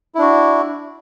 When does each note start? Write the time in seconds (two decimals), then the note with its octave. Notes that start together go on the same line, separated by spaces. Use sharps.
0.15 E4
0.18 D4
0.22 F#4